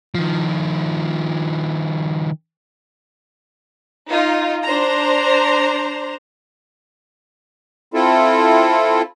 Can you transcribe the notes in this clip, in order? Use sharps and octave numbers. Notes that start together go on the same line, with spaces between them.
D#3 F3
D#4 F4
D4 C5 A#5
C4 E4 F4 A4